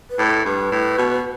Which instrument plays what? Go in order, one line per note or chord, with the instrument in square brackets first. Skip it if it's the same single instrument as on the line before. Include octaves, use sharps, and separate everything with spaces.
[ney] B4
[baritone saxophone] A2
[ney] A4
[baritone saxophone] G2 [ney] B4
[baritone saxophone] A2
B2